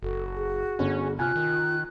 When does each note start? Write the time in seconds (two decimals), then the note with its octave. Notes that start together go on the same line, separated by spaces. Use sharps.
0.03 F#1 F#4 A4
0.36 G#4
0.79 G1 C#4
1.19 C3 F4 G#5 F6 F#6
1.36 D#3